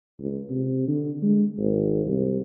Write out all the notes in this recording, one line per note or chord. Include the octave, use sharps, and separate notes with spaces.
C#2
C3
D3
G#3
G#1
C2